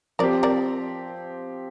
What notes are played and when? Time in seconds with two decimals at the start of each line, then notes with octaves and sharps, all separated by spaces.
0.19 F3 C4 G4 A#4 D5
0.43 A#4 D5